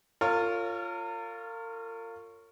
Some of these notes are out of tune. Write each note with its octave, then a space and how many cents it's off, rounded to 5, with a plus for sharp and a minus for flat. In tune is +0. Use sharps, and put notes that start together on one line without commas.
F4 +0 A#4 -40 C#5 +0